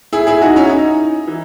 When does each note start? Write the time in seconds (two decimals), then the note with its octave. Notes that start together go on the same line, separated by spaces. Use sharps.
0.13 E4 G#4
0.27 E4 G#4
0.42 D#4 F#4
0.56 C#4 E4
0.70 D#4
1.27 E3